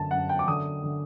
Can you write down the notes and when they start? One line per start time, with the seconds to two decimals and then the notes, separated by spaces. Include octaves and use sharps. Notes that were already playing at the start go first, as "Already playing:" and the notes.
Already playing: F#2 D3 A5
0.11 F#2 F#5
0.29 G5
0.39 D6
0.47 D3 D#6
0.84 D3